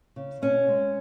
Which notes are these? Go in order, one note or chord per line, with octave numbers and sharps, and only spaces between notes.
C#3
B2 C#4
G#3